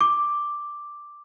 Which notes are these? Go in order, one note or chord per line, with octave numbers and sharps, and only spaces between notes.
D6